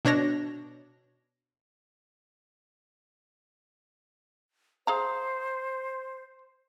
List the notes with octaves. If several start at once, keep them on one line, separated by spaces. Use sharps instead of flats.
B2 D4 C#5 A#6
G#4 C5 F5 A#5